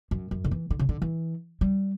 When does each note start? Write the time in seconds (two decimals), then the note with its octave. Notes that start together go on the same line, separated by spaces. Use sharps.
0.11 F#2
0.31 F#2
0.44 D3
0.51 E3
0.70 D3
0.79 C#3
0.89 D3
1.02 E3
1.61 G3